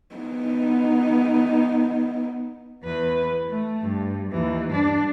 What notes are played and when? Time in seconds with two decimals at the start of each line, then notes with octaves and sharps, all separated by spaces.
0.15 B3 D#4
2.84 E2 B4
3.48 A3
3.82 G2
4.31 D#2 E3
4.68 G2 D4